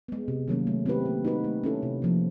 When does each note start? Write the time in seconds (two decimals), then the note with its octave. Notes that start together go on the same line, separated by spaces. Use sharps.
0.08 G#3 B3
0.28 C3
0.48 D#3 F#3 A#3 C#4
0.67 A3
0.86 C4 E4 G4 B4
1.05 A#3
1.25 D#4 F#4 B4
1.44 A3
1.64 C#4 E4 A4
1.83 C3
2.02 F3 A#3